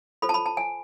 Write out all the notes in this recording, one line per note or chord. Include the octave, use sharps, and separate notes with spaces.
F4 A4 C5 B5
A5
B5
A5
G#5